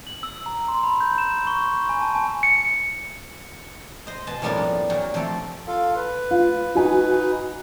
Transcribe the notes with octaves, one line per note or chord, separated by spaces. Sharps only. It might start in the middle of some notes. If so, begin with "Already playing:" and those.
F#7
E6
A#5
C6
B5
G6
E7
C#6
G#5
A5
G#5
C#7
C5 D#5
B2 G#5 A5
F2 A2 G3 A#3 B3 D4
A#2 F#3 G5
C3 F3 A3 C4 G4 A4
F4 A4 F5
B4
F4
D#4 F#4 B4 G#5